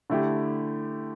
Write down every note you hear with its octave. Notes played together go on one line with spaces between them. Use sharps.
D3 A3 E4 G4